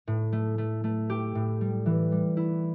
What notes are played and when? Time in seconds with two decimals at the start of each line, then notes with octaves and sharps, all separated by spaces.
0.07 A2
0.33 A3
0.58 A3
0.84 A3
1.10 G4
1.35 A2
1.61 G3
1.86 E3
2.12 G3
2.37 E4